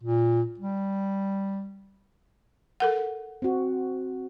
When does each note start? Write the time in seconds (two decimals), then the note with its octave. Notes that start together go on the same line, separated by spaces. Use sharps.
0.03 A#2
0.60 G3
2.80 A4 A#4 F#5
3.42 C4 F#4